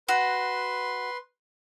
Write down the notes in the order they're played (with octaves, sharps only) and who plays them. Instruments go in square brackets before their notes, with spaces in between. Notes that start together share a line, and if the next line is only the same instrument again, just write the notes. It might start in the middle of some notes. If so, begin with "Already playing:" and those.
[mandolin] F#4 [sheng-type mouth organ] B4 C6